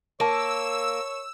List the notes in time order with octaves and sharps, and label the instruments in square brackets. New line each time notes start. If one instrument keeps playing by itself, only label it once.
[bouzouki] A#3 [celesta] A#4 A5 [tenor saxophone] C#5 [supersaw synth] E6